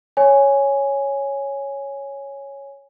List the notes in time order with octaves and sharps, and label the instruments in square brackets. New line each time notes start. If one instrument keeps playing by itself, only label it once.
[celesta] C#5 G#5